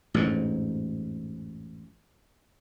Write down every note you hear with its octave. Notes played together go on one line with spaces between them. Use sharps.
A1 F2 G#2